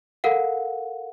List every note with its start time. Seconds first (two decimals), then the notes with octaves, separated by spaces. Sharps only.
0.24 A4 A#4 F5 F#5